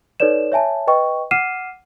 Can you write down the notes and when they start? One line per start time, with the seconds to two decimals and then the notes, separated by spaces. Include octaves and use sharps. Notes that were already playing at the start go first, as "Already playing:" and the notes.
0.20 D#4 A4 B4 C#5 D5 E7
0.52 C#5 E5 G#5 A5
0.87 B4 D#5 G5 C#6
1.31 F#5 D6 F6 C7 D#7 E7